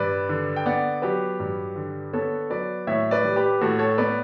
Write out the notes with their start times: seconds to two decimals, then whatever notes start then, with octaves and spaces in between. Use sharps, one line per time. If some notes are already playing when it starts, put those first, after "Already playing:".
Already playing: G2 B4 D5
0.29 D3
0.56 G5
0.66 B3 D5 F#5
1.02 F#3 G4 B4
1.40 G2
1.76 D3
2.13 B3 A4 C#5
2.50 F#3 B4 D5
2.87 A2 C#5 E5
3.11 B4 D5
3.24 G3
3.36 G4 B4
3.61 A2 F#4 A4
3.79 A4 C#5
3.98 B3 B4 D5